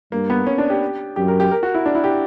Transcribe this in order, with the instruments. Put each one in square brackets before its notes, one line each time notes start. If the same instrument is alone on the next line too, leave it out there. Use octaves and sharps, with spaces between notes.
[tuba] G2 [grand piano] A#3
[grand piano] B3
C#4
D4
G4
[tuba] F#2 [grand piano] G4
[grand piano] A#4
G4
A#4
F#4
E4
D4
E4
G4